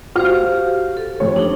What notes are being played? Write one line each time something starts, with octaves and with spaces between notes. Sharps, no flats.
F#4 G4 C5 F5 F6
A4
F2 C3 C#5
D4 D#4